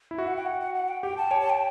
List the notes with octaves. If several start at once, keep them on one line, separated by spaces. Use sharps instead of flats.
E4
F#4 E5
F#5
G5
F#5
F#5
F#5
G5
G4 G5
A5
C#5 G5
A5
G5